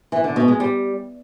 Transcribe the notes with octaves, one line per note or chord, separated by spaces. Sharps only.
E3
D3
B2
G#3
G3